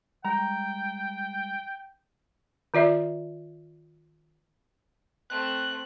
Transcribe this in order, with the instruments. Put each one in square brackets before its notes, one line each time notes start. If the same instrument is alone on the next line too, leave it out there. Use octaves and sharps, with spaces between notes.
[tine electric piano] G3 G#3 [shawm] G5 [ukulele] A#5
[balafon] D#3 F4 D5 E5
[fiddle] A3 C4 [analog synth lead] F#6